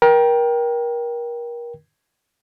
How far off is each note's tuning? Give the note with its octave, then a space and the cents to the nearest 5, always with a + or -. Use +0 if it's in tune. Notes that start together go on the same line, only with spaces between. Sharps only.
A#4 +30 G5 +0